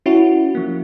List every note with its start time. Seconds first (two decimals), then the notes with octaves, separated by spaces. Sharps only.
0.06 C#4 E4 F#4
0.55 F3 A#3